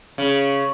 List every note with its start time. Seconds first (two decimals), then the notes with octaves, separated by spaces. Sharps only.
0.18 C#3